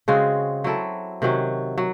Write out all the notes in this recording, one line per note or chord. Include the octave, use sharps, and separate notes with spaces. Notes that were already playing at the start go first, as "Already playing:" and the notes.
C#3 G#3 C4 F#4
F#3 C4 E4 A4
C3 D#3 F#3 C#4
F#3